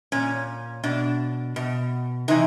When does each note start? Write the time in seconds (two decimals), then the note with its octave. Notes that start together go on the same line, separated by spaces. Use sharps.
0.12 A#2 C#4
0.84 B2 D4
1.56 B2
2.28 C3 E3 D#4